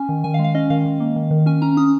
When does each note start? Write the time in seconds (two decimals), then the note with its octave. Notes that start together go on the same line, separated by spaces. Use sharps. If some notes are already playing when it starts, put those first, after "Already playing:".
Already playing: C#4 G#5
0.09 D#3
0.24 D#3 G#5
0.34 F5
0.39 G#3
0.44 F5
0.55 C#4 D#5
0.70 D#3 F5
0.85 D#3
1.00 A#3
1.16 D#3
1.31 D#3
1.46 C#4 G#5
1.62 C#4 A#5
1.77 C#4 D#6